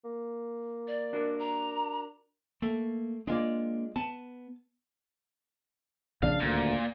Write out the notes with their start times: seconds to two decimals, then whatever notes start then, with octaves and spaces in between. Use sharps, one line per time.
0.05 A#3
0.88 D5
1.13 D4 F#4 A#4
1.39 A#5
2.62 A3 A#3
3.27 G#3 A#3 D4 F4 D5
3.96 B3 A5
6.22 A#1 C#3 D4 F5
6.40 D#1 D2 A#2